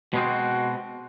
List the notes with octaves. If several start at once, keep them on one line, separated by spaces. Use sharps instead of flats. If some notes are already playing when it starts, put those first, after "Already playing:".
B2 G#3 C4 F#4